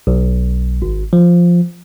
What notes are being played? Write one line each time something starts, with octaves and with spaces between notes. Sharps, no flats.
B1
G#1
F3